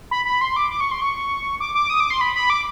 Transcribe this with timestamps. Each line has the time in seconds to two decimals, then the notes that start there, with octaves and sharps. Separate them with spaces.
0.11 B5
0.25 B5
0.41 C6
0.56 D6
0.71 D6
0.80 C#6
0.91 C6
1.01 C#6
1.60 D6
1.75 D6
1.90 D#6
2.00 D6
2.10 C6
2.21 B5
2.35 B5
2.50 D6